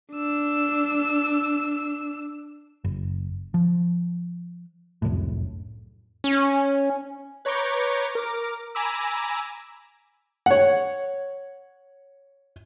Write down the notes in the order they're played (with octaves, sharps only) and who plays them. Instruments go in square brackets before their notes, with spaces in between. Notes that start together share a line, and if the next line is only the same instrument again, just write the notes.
[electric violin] D4 E6
[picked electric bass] F#1
F3
F1 C2 F#2 A2
[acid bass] C#4
[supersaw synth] B4 C#5 A#5 C#6 D6 G6
A#4 D6
G#5 A#5 B5 D6 E6
[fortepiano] C#5 F#5